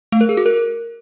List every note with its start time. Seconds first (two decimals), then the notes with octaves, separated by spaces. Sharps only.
0.12 A3
0.21 A#4
0.29 G#4
0.37 F#4
0.46 A#4